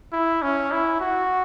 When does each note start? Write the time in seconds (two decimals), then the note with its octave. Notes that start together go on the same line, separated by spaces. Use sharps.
0.13 E4
0.42 C#4
0.72 E4
1.00 F#4